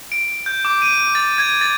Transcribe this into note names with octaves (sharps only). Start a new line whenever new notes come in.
D7
G6
D6
D#7
A6
G#6
A6